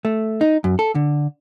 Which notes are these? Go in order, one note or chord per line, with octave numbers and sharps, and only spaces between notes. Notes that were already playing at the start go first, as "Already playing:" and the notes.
A3
D#4
F#2
A4
D3